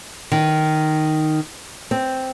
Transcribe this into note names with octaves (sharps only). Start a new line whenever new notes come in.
D#3
C4